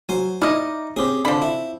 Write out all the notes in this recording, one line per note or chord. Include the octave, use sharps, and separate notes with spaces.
F#3 C5 G#5
D#4 E4 D5 D#5 F6
C4 C#4 G4 G#4
D3 F3 D4 B5
E4